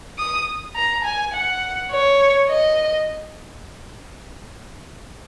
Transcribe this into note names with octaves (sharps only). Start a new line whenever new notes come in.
D#6
A#5
G#5
F#5
C#5
D#5